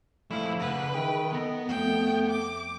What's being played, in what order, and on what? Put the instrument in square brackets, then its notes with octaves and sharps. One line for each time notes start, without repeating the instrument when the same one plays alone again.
[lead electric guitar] F2 D4 [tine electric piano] A3 F5 [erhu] E4
[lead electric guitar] C#3 F#5 [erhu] B4
[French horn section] D#3 [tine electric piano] G#4 E5 [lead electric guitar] G5
[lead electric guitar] B3 [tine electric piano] A4 A#6
[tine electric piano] F2 [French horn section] A3 [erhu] G5
[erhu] D6